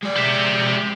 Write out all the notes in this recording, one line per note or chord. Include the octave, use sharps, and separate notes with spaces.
G#3 D5
G4 E5